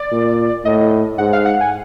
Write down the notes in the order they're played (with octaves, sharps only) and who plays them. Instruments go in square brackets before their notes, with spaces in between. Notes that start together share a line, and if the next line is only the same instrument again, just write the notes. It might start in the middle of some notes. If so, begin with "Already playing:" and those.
Already playing: [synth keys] D5
[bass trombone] A#2
[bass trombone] A2 [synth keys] D#5
[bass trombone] G#2 [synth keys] F#5
[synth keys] F5
F#5
G#5